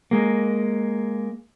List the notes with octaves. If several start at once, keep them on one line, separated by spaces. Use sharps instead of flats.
G#3 A#3